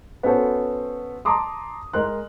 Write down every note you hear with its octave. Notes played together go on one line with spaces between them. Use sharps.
B3 C#4 F#4 A4 C5
A5 A#5 C6 D6 D#6
G#3 A#4 C6 F#6